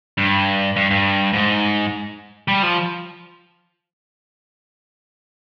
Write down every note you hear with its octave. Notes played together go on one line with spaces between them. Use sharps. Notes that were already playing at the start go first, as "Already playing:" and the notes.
G2
G2
G2
G#2
G3
F3